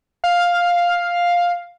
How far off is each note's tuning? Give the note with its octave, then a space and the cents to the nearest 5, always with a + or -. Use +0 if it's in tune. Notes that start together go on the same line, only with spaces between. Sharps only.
F5 +5